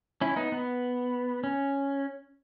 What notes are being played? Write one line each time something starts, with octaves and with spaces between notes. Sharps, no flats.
C#4 E4
B3 D#4
B3
C#4